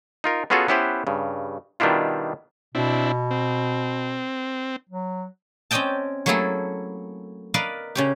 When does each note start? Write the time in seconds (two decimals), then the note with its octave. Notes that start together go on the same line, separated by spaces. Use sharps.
0.24 D#4 F4 A#4
0.50 B3 C#4 F4 F#4 G#4 A4
0.68 B3 C#4 E4 G4 B4 C5
1.07 G2 C#3
1.80 B2 D#3 G3 D4 E4 F4
2.75 B2 C4 D4 E4
3.31 C4
4.90 F#3
5.71 C4 C#4 D5 D#5 G5 A5
6.26 F#3 A3 A#3 E4 G#4 A4
7.54 A#4 B4 D5 D#5 F5
7.95 C#3 C#4 G4